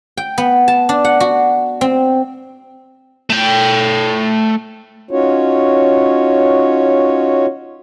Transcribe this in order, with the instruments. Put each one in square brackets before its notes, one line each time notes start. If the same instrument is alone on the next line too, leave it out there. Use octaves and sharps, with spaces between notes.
[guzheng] G5
B3
A5
D4
F#5
F#4
C4
[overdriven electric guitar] A3 G5
[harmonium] C#4 D#4 F4 F#4 C#5